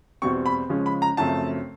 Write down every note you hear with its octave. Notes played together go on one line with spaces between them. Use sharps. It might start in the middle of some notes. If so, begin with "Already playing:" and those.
E2 B2 G3 C4 C#6
B5
C#3 F3 G#3 C#4
B5
A#5
F#2 C#3 F3 A3 C4 A5